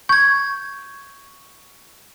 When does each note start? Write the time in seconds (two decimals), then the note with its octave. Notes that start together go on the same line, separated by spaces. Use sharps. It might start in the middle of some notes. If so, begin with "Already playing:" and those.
0.09 C#6 G6 G#6